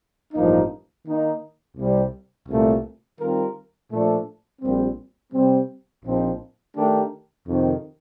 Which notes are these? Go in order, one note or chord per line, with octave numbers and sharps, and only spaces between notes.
A1 G2 F3 A#3 D#4
D#3 A#3 D#4
C2 C3 G3
C2 A#2 A3
D#3 G3 C4 F4 A#4
A#2 F3 A3 D4 A4
A#1 A#2 G3 C4
C3 G3 C4
A#1 A#2 F3 C4 D#4
D#3 A3 D4 G4 A#4
F2 C3 D#3